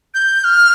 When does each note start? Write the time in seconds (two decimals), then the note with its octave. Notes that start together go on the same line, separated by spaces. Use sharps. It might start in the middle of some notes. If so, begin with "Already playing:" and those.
0.14 G6
0.44 F6